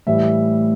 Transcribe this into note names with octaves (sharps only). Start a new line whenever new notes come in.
A2 E3 G3 E5